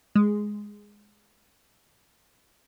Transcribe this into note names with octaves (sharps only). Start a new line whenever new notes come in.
G#3